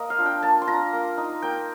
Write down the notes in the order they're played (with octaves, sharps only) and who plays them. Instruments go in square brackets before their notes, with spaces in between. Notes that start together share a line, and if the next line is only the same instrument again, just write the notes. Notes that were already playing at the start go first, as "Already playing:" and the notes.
Already playing: [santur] A#3 D#5
F5
D4 F4
G5
A#3 A5
C6
D4 F4 A#5
A#3
D#4
A#3 G5